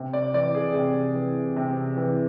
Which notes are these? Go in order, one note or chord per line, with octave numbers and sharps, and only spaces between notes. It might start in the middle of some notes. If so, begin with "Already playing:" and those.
Already playing: C3
D5
E3 D5
G#4
C3
E3
C3
E3